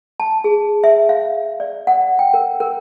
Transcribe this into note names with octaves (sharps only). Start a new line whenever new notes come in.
A5
G#4
E5
F5
D5
F#5
G5
A#4
A#4